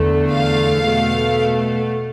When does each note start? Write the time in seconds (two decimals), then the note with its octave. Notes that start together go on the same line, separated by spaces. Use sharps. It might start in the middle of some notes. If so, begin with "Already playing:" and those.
Already playing: E2 D3 A3
0.32 F5
0.85 B2 A3